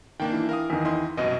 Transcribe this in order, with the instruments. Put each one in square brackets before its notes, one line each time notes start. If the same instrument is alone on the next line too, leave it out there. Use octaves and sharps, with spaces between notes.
[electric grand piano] D#3 A#3 D4 [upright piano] G5
[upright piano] E3
[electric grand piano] A#4 F5 D#6
[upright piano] E2 D#3
[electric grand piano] E4 D#5 C6
[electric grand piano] C2 F#2 B2 [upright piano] D#5